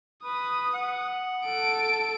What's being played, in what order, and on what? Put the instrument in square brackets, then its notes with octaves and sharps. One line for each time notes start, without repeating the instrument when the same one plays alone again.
[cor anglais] B4 [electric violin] D#6
[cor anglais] F#5
[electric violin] A4 D7